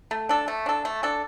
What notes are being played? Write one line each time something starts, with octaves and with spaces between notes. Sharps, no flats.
A3
D4 A4
A3
D4 A4
A3
D4 A4